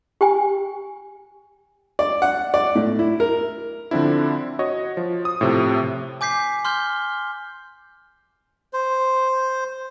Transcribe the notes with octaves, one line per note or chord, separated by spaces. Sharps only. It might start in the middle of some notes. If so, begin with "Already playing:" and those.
G4 G5 G#5
D5
F#5
D5
A2
E4
A#4
D3 F3 C4 D4 E4
F#4 C#5 D#5
F3
D#6
A2 C3 F3
G#5 D6 G6 B6 C7
C6 F6 G6 G7
C5